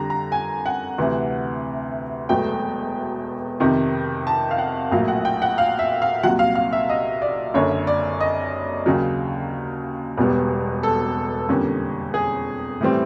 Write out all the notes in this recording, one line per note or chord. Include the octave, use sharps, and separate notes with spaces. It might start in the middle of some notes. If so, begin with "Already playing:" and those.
Already playing: F2 D3 G3 A#5
A#5
G#5
F#5
D2 C3 E3
E1 E2 B2 F#3 A3 G5
F2 C3 D#3
A5
F5
F#5
A#1 A2 F#3 A#3 F5
F#5
G5
F#5
F5
E5
F5
C2 A#2 F#3 F#5
F5
F5
E5
D#5
D5
F#1 F#2 D3 C#5
D5
D#5
D#2 C#3 F#3
E1 E2 B2 G3 B3
A4
F2 D3 G3 A#3 C#4
G#4
A2 E3 G3 C4